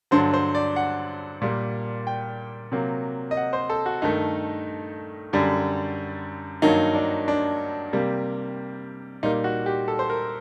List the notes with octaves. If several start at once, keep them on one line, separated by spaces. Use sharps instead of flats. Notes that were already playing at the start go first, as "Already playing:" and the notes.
G2 D3 F#3 C5
C5
D5
F#5
A#2 G3 A#3
G5
C3 F#3 A#3
D#5
F#5
C5
A4
F#4
G2 D#3 A3 D#4
F#2 D3 G3
G2 D#3 F#3 A#3 D#4
D4
D4
C3 G3 A#3
A#2 G3 A#3 D#4
F#4
G4
A4
C5
A#4